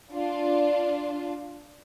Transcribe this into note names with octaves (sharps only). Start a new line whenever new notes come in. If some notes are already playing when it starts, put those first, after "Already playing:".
D4 F4